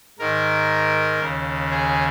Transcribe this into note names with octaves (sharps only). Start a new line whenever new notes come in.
G#2 D#3 A#4
D#2 C#3
G#4